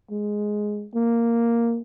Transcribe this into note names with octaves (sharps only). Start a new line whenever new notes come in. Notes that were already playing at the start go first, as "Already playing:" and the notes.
G#3
A#3